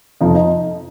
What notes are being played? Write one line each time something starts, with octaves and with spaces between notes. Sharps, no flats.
F2 C3 F3 D#4 D#5
D#4 D#5